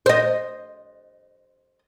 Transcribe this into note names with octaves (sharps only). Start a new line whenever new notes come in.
C5 D#5